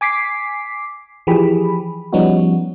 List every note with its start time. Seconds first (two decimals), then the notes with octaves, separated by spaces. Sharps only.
0.01 G#5 D6 B6 C7
1.27 E3 F3 G4 G#4 B5
2.13 F3 G3 B3 C#4 D#4 F#4